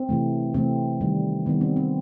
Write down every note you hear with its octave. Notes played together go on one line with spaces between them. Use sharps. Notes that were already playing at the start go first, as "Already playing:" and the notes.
Already playing: C4
C3 E3 A3
C3 E3 A3 C4
D#3 G3
D#3 G3 B3
C4
C4